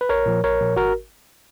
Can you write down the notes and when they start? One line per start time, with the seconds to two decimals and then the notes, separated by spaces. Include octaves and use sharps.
0.01 B4
0.09 A#1 A#4 C#5
0.26 A#2 F3
0.43 A#1 A#4 C#5
0.61 A#2 F3
0.76 G#1 F#4 A#4